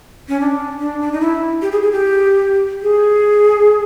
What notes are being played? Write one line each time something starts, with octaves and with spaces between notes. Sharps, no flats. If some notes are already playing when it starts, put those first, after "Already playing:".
C#4
D4
D4
D4
D#4
E4
G4
G#4
G#4
G4
G#4